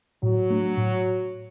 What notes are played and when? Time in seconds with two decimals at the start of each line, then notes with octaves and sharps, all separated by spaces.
0.22 A2 F#3
0.50 A3 D4
0.78 A2